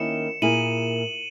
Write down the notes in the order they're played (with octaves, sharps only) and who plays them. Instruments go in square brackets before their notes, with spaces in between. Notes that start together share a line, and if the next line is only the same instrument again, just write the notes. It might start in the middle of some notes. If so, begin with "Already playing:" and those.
Already playing: [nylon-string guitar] D#3 A#3 C#4 E4 [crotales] C#7 E7
[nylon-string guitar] A#2 A#3 E4 G#4 [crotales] D#7 F#7